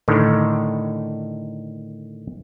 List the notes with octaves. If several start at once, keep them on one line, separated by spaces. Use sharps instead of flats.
A2 D3 D#3